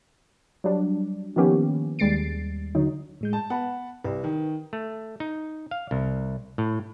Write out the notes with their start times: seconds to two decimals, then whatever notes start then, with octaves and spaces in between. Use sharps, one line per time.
0.64 F#3 G3 D4
1.36 D#3 F3 A#3 B3 C#4 G4
1.99 D#2 G3 G#3 A6 C7 D7
2.75 D3 F#3 D#4
3.21 A2 G#3 G6
3.33 A5
3.50 B3 F#5 A5 B5
4.04 C2 B4
4.24 D#3
4.73 A3
5.20 D#4
5.71 F5
5.91 C2
6.58 A2